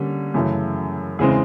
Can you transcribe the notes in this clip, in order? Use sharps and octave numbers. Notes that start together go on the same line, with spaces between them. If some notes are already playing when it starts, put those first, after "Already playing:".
Already playing: D3 G3 A#3 C#4
F#2 C#3 E3 A3
E2 C#3 E3 G#3 C4 G#4